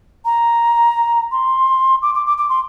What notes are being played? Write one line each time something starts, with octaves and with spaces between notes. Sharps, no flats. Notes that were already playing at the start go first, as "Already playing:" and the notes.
A#5
C6
D6
D6
D6
D6
C6